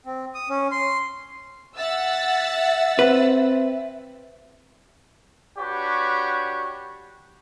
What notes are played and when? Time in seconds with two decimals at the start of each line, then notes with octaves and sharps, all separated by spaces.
0.06 C4
0.34 D#6
0.50 C#4
0.71 C6
1.78 E5 F#5 E6 A6
2.99 C4 B4
5.59 D4 F#4 G4 B4 C#5